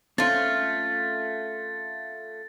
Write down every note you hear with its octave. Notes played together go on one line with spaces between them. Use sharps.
A3 C4 C#4 F4 C5 A6